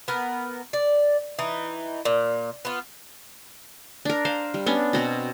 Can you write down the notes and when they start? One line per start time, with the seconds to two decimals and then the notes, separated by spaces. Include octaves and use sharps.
0.08 B3 A#4
0.73 D5
1.39 E3 D#4
2.05 A#2
2.65 B3 F4
4.05 D4 A#4
4.25 C5 F5
4.54 G3
4.66 B3 C#4 D4
4.93 B2 C4 F#4